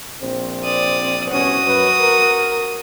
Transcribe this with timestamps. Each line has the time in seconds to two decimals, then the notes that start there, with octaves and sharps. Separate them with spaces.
0.21 A#1 C4
0.64 D5 D#6
1.30 C2 B3 C#4 F#4 D#6
1.65 F#2 B4
1.99 A#4